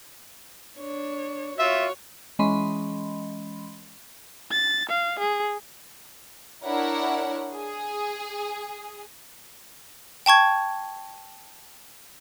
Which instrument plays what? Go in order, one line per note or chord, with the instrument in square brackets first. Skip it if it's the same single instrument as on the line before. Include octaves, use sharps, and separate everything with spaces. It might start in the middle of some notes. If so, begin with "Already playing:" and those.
[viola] D4 C#5
[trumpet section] F4 E5 [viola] F#4 C#5
[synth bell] E3 G#3 C#4 D#5 B5 C6
[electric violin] A6
F5
G#4
[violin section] D4 E4 A#4 C#5 F#5
G#4
[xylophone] G5 A5 C#6 G#6